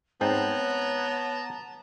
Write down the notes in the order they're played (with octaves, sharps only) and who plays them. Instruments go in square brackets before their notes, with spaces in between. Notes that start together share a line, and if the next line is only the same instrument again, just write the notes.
[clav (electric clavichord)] G#2 C4 D#4 [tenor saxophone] B3 [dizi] C#5 [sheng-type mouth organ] A5 A#5